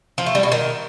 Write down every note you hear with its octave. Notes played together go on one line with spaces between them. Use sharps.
F3
A3
G3
B2
D#3